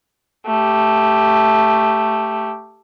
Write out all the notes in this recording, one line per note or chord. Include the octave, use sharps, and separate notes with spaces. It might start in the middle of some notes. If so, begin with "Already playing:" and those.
A3 G4